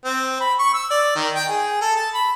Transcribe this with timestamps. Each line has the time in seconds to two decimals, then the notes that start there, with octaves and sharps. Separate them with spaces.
0.05 C4
0.40 B5
0.59 C#6
0.74 E6
0.91 D5
1.16 D#3
1.35 G5
1.48 G#4
1.81 A4
1.96 A5
2.14 B5